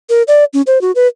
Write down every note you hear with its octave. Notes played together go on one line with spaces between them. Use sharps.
A#4
D5
C#4
C5
F#4
B4